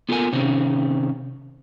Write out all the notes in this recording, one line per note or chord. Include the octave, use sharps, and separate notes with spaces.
B3 F4 G4 A4 A#4 G#5
C3 D#3 C4 C#4